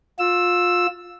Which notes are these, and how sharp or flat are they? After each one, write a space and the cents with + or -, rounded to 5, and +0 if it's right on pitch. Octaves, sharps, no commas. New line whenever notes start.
F4 +25 E6 +0